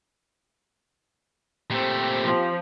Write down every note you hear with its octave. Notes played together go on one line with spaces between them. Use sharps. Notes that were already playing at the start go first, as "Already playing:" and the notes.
A#2 A3 C4 G4
F3